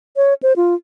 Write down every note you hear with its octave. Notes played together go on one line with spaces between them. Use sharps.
C#5
C5
F4